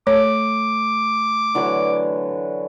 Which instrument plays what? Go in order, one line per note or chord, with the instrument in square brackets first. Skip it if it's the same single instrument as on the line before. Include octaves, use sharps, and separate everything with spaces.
[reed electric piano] A3 [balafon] C#5 [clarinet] D6
[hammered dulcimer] D3 E3 F#3